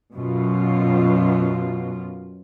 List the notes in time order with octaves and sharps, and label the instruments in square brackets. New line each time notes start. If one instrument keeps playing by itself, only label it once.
[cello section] F#2 B2 F4